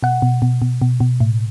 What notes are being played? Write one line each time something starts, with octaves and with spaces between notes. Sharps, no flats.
B2 F#5
B2
B2
B2
B2
B2
A2